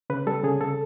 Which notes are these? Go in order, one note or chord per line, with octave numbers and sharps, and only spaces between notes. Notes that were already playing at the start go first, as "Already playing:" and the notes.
C#3 B4
G3 A4
C#3 G#4
C#3 A4